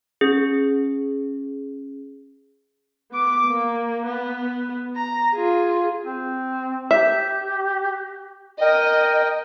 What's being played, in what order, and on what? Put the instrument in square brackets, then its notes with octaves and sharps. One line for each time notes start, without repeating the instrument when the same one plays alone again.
[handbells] C#4 G#4
[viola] B3 D6
A#3
B3
A#5
F4 G#4
[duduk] C4
[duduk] G4 [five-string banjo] E5
[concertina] A#4 G5 [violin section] D#5